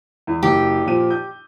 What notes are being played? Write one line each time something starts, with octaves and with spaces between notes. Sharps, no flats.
E2
F#1 G4
A#2 F3 D#7
G6